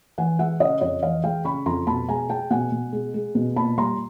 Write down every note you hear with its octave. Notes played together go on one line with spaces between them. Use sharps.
E3 F#5 G#5
G#3 E5 F#5
C#3 D#5 F5
F2 C#5 D#5
E3 D#5 F5
G#3 F5 G5
C#3 B5 C#6
F2 A#5 C6
B2 A5 B5
G#3 G#5 A#5
G#3 G5 A5
B2 F#5 G#5
B2
G#3
G#3
B2
A#2 A5 B5
G3 A#5 C6